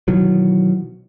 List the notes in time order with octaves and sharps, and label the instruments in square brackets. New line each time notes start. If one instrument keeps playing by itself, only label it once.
[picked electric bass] B2 D#3 E3 F#3